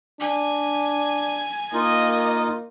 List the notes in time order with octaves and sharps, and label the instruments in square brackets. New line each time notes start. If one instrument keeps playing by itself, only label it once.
[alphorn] D4 [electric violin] G#5
[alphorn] A#3 [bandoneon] D#4 F4 [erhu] D#5